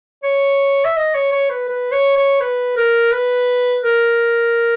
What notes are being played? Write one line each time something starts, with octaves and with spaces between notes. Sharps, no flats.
C#5
E5
D#5
C#5
C#5
B4
B4
C#5
C#5
B4
A#4
B4
A#4